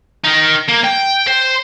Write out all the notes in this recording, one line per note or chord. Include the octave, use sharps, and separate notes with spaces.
D#4 A#4
A#3
G5
C5